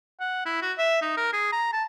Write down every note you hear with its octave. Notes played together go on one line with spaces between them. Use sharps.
F#5
E4
F#4
E5
D#4
A#4
G#4
A#5
A5